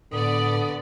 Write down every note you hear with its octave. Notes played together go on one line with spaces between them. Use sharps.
A2 D3 B3 D5 D#6